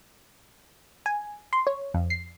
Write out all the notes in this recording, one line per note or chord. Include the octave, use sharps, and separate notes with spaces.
G#5
C6
C#5
F2
C7